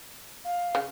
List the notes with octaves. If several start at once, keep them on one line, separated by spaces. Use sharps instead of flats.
F5
C#3